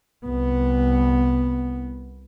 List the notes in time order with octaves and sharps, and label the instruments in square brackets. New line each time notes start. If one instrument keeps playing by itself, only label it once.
[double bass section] C2 B3